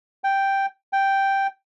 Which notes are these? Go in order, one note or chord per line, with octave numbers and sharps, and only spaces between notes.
G5
G5